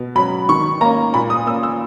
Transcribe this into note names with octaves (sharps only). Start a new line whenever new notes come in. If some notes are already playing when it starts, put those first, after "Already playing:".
Already playing: B2
F#3 C#4 B5
D#3 C#6
A#3 C#4 A#5
A#2 B5
D#6
A#3 C#4 E6
E6